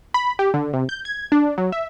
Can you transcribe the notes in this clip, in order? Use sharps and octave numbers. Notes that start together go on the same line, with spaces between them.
B5
G4
D3
C3
G6
G#6
D4
F#3
E5